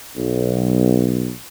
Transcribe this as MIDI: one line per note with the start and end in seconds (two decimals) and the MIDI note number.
0.16 1.30 35